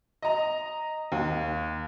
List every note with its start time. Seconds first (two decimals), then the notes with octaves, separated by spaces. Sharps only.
0.22 D#5 A#5
1.12 D#2